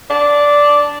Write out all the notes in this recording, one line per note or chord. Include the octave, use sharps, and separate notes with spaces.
D4